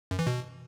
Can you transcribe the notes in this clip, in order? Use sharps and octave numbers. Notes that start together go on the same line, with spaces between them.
F#2
E3
B2